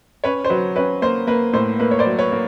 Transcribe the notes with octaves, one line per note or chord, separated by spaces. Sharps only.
C#4 B4 C#5
C5
F#3 B4
C#4 B4
A#3 C5
A#3 B4
A2 C5
A#3 B4
C#5
C5 D5
F#3
B4 C#5
A#3